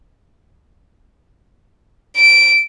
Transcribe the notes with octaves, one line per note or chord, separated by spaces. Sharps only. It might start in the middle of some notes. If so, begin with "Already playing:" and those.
D7